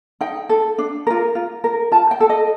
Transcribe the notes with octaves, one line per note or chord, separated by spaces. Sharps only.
D#4 G5
A4
D4
F4 A#4
F4
A#4
F4 A5
G5
A4
D#5